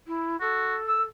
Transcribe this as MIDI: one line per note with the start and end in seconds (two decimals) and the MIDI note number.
0.07 0.36 64
0.41 0.76 66
0.41 1.06 69
0.88 1.04 88